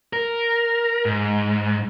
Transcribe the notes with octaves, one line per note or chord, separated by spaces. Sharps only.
A#4
G#2